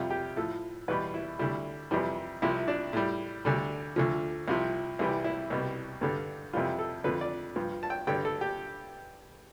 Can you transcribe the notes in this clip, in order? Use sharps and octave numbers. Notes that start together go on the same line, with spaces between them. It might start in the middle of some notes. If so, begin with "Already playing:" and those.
Already playing: F2 C3 G3 F4
G4
A2 F3 A4
E2 B2 G3 B4
E4
D2 D3 G3 E4
F2 C3 E3 G3
C2 C3 F3 E4
D4
A2 G3
D2 D3 G3
D2 D3 F3
C2 C3 F3
C2 C3 E3 G3
E4
C2 B2 G3
G2 D3 G3
F2 C3 E3 G3 F4
A4
F2 D3 F3 B4
D5
G2 F3
A5
G5
G2 D3 G3 G5
A4
G4